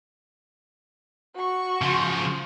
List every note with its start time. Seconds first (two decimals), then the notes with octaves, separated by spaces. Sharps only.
1.35 F#4 C#6
1.82 C#3 F3